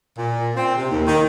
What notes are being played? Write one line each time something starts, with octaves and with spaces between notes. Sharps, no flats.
A#2
C4
C3
D#2
D#3